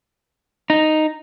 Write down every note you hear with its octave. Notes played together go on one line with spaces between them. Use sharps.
D#4